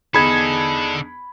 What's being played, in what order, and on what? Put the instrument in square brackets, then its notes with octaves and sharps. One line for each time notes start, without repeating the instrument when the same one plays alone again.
[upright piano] E2 D#4 G#4 [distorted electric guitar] D3 A4 [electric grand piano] B5 G#6